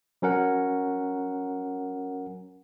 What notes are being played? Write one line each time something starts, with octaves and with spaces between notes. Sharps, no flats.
F#3 C#4 A#4 F#5